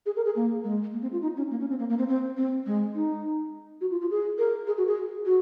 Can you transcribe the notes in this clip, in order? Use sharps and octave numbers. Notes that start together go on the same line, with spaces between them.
G#4
A#4
G#4
A#3
G#3
A#3
C4
F4
D#4
C#4
A#3
C#4
C4
A#3
A#3
C4
C4
C4
G#3
D#4
F#4
F4
F4
G#4
A#4
G#4
F#4
G#4
F#4